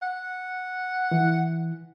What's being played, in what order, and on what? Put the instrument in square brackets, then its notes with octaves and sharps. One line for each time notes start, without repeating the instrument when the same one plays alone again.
[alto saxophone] F#5
[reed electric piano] E3